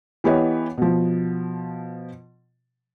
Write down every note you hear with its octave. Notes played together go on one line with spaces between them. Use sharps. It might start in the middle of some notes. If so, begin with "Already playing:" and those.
E3 B3 G4 C#5 D#5
B2 F3